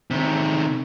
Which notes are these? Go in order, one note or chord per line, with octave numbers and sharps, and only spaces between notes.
C3 D#3